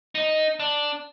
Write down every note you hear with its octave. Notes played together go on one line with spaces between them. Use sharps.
D#4
D4